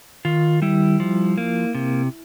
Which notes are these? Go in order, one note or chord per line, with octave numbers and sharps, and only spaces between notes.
D#3 F4
G3 E4
F3
A#3
C3